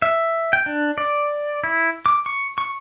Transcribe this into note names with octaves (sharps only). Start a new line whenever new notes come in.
E5
G5
D4
D5
E4
D6
C#6
C#6